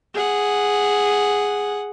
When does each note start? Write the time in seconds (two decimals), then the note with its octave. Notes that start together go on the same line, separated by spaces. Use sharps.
0.14 G#4 F#5